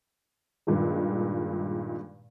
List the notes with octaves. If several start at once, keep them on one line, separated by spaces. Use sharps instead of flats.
G2 A#2 D#3 G#3